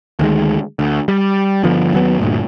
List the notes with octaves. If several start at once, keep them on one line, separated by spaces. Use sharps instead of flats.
D2 D#3 G#3
D2
G3
G1 D3 F3 B3
D#2 F#3 B3
D2 G2 A#2